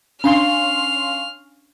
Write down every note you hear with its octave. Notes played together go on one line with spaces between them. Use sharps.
C#4 D4 F5 C6 F6